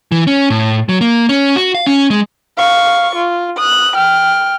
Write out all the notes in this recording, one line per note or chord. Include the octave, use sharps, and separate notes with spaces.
E3
C#4
A2
F#3
A#3
C#4
F#4
F5
C#4
G#3
F5 C#6
F4
D#6 F#6
G5 F6